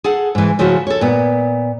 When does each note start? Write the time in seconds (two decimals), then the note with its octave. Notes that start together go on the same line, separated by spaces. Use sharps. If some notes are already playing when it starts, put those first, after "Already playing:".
0.04 G#4 A4 F#5
0.35 G#2 E3
0.59 C#3 F3 A3 E4 F#4
0.87 A4 C#5
1.01 A#2 B3